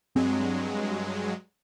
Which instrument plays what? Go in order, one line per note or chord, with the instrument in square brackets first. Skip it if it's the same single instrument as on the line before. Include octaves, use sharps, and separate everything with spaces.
[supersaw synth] G2 F#3 G#3 [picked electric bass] C4